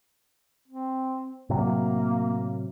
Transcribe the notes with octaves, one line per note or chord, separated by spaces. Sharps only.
C4
A2 C3 F#3 A#3